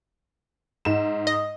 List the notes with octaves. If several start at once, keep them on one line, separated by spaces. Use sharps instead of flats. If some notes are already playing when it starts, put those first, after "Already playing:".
G#2 E7
D#5